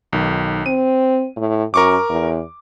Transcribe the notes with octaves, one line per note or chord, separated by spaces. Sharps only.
B1 D#3
C4 D#7
A2
F#2 A#4 C#6 D6
E2